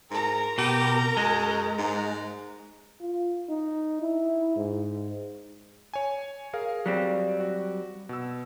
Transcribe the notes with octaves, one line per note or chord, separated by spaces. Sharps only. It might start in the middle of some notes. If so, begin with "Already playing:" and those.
G#2 A#4 A#5
B2 G4
F#2 G#3
G#2
F4
D#4
E4
G#2
C#5 G#5
G#4 A#4 F5
F#3 G3 C4
F#4
B2 E6